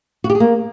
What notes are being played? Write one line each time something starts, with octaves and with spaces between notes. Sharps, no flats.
F#4
G4
G#4
A#3